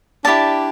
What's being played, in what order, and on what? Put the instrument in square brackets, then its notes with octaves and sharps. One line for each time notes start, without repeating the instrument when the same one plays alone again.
[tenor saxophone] D4 [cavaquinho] E4 G4 D5 A5